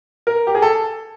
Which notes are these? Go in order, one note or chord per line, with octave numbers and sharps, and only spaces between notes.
A#4
G4
G#4
A4